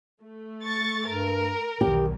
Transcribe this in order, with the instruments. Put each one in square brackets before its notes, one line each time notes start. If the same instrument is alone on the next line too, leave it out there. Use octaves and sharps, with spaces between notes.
[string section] A3
[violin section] C#6 A6
[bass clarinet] G2 [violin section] A#4
[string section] B1 E2 [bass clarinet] D#3 [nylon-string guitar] G4